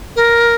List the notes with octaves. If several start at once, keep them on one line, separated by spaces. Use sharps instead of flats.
A#4